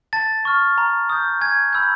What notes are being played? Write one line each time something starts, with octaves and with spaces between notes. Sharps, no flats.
A5 A6
C#6 F6
A#5
D#6 G6
G#5 G#6
B5 E6 G6